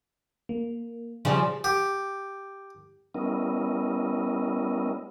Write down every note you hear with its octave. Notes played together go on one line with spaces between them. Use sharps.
A#3
C#3 F3 G3
G4
G3 B3 C#4 E4 A#4 D#5